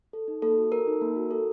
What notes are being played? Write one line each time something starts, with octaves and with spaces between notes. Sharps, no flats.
A4
D#4
A#3 A4
F#4
A4 A#4
D#4
A#3
F#4
A4